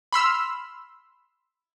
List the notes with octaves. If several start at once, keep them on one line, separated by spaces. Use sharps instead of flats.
B5 C6 E6 F6